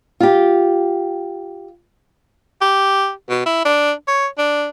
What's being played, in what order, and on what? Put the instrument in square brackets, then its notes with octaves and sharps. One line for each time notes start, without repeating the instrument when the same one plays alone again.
[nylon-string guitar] F4 G4
[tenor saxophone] G4
B2
E4
D4
C#5
D4